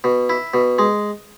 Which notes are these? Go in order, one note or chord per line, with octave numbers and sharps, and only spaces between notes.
B2
E4
B2
G#3